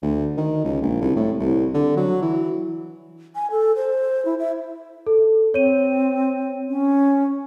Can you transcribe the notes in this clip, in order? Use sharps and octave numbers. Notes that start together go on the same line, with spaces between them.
D2
D#3
C#2
A#1
C2
A2
C2
D3
F#3
E3
G#5
A4
C5
E4
E5
A4
C4 C#5 D#7
C#4